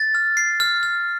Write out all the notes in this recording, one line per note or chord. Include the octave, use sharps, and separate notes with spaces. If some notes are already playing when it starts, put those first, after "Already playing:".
Already playing: A6
F6
C7
F6
F6